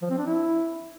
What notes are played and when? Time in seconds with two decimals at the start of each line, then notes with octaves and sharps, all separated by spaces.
0.02 F3
0.10 C4
0.18 D4
0.26 E4